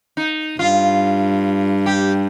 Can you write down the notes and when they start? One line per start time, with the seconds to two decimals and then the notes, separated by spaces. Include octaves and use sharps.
0.17 D#4
0.59 G2 F4
1.86 G4